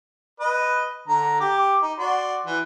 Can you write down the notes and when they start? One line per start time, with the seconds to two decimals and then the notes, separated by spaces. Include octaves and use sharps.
0.40 B4 D#5
1.08 D3 A#5
1.40 G4 D6
1.82 D#4
1.99 F#4 D5 C6
2.46 E3